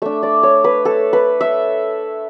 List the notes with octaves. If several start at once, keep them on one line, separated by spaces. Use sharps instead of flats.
A3 D4 E5
D5
C#5
B4
A4
B4
E5